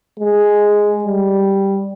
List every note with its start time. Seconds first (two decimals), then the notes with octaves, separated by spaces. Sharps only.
0.20 G#3
1.04 G3